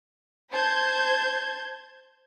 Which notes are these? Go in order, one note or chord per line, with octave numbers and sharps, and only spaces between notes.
C5 A5 G6 G#6